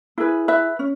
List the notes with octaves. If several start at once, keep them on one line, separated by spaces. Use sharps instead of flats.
E4 G#4 B4
B4 E5
C#4